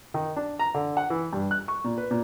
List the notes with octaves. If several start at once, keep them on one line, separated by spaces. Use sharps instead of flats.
D#3
D4
A#5
D3
F#5
E3
G2
F#6
C#6
A#2
B4
A#2